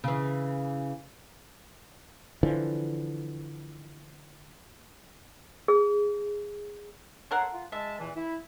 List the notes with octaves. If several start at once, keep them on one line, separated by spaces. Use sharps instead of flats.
C#3 E3
D3 E3 F3
G#4
A4 A#4 C#5 F#5 A5 C6
F4
G#3 E5 A5
E2 A#2 E3
E4